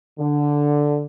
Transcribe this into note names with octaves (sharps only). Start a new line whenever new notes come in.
D3